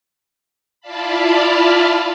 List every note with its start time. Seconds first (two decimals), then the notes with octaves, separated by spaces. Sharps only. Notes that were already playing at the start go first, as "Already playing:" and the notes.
0.81 E4 F4 D5 F5 A5 B5